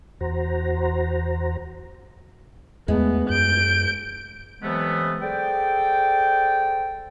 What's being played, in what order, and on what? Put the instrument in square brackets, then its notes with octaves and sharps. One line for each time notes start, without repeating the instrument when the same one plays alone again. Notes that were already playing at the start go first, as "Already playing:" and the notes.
[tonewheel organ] E2 F#4 C5 A#5
[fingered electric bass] E2 A3 [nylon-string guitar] G#3 [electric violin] B3
[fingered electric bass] F#2 [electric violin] G6 D7
[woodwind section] C3 E3 F#3 G#3 A3 B3
G#4 A4 C5 D5 G5